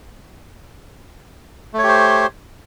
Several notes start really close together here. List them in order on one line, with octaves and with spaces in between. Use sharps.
A3 C#5 G4 C5